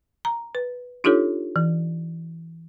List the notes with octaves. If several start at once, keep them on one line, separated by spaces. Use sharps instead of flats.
A#5
B4
D4 D#4 F4 G4 A4 C#5
E3